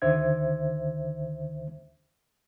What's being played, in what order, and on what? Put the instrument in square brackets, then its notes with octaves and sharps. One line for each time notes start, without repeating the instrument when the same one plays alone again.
[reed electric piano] D2 D3 D#3 C5 E5 G#6